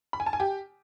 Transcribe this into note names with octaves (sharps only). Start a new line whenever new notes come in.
B5
G#5
A5
G#5
G4